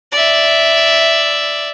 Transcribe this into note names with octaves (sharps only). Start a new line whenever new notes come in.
D5 E5